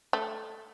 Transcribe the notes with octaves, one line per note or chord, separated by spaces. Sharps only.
A3